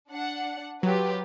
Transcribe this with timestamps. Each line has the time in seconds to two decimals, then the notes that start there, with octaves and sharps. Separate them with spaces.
0.11 D4 F#5
0.83 F#3 F4 G4 B4